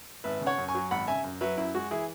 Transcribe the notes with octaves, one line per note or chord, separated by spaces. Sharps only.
G#1 B4 E5
C#3
C#5 F#5
F#2
G#5 C#6
F#3
G#1 F#5 B5
C#3 E5 G#5
F#2
F#3 B4 E5
F#2 E4
G#3 F#4
E3 E4 G#4